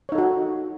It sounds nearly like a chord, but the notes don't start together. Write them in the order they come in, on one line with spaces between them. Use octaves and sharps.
C#5 D#4 A4 F#4